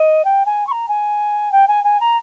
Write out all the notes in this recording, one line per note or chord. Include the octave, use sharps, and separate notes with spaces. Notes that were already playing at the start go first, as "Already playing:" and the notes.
Already playing: D#5
G5
G#5
C#6
A#5
G#5
G5
G#5
G#5
A#5